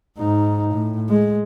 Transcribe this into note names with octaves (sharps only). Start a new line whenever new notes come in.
G#2 D#4
A2
G#3